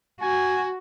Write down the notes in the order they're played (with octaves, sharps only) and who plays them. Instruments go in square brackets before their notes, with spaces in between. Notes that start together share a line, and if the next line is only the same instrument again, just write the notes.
[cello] F#4 [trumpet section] G#5